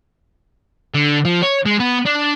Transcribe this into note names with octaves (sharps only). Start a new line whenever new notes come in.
D3
F3
C#5
G#3
B3
D4